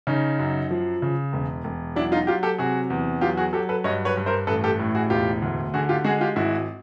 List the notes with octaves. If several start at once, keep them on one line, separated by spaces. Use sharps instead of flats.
C#3 C#4 D#4
F#2
F3
C#3
E1
E1
F#3 D4 E4
D#4 F4
F#3 F4 G4
G4 A4
C3 F#4 G#4
E2
F#3 F4 G4
F#4 G#4
F#3 G4 A4
A4 B4
G2 C#5 D#5
B4 C#5
G2
A#4 C5
A1 A4 B4
G4 A4
A2
F#4 G#4
E1 F4 G4
D2
D3 F#4 G#4
F4 G4
G#3 F#4 G#4
F4 G4
G#1 E4 F#4